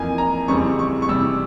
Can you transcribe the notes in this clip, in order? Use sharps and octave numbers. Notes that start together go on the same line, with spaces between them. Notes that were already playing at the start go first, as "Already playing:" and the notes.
Already playing: F2 E3 A#3 G#5
A#5
F2 C#3 E3 G3 C4 C#6
C#6
C#6
C3 E3 G3 E6